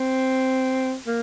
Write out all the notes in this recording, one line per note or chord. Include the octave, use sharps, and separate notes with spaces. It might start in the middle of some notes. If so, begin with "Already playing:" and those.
Already playing: C4
A#3